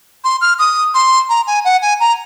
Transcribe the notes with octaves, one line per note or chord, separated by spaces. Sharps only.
C6
F6
D#6
C6
A#5
G#5
F#5
G#5
A#5